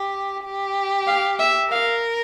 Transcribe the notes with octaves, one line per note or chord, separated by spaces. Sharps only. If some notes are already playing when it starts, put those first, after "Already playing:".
Already playing: G4
G4
F5
E5
A#4 F5